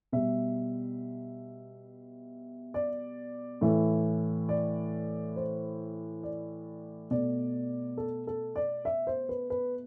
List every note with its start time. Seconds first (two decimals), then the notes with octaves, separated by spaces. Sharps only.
0.12 B2 G3 E5
2.74 D5
3.61 A2 E3 A3 E5
4.49 D5
5.36 C5
6.23 D5
7.11 B2 A3 D5
7.97 A4
8.27 A4
8.56 D5
8.85 E5
9.07 C5
9.29 B4
9.50 B4